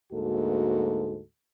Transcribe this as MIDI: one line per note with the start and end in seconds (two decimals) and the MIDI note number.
0.13 1.20 38
0.13 1.20 44
0.13 1.20 58
0.13 1.20 66
0.13 1.20 69